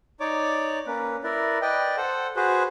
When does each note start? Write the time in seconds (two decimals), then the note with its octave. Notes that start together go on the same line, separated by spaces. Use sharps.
0.20 D#4 C#5 D5 D6
0.87 A#3 C#4 B4
1.24 E4 A#4 B4 D5
1.62 B4 D5 D#5 G5
1.97 A4 C5 F#5
2.36 F#4 G#4 B4 C5